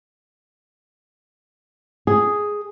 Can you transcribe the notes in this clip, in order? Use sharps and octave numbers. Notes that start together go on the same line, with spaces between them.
G#4